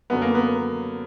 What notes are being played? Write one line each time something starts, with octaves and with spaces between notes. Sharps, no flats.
F#2 D3 F#3 B3
A#3
B3